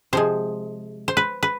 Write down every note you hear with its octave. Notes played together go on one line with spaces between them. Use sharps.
C3 F3 G#3 C5
C5
B4
B4